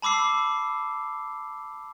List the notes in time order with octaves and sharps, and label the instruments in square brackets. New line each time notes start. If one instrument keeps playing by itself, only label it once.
[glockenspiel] A5 B5 D6 E6 C7